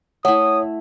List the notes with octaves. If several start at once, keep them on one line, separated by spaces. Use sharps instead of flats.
A3 E4 C#5 F#5 D#6